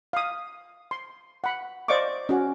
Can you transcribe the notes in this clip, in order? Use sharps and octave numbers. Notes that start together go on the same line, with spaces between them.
F5 D#6
C6
F#5 B5
C5 D5 D#5 F5 C#6 D6
C#4 F#4